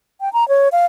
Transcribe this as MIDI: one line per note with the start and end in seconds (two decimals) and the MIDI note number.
0.21 0.32 79
0.33 0.48 82
0.49 0.69 73
0.72 0.86 77